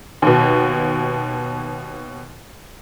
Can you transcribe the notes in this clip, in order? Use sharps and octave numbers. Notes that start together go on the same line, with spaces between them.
D#2 B2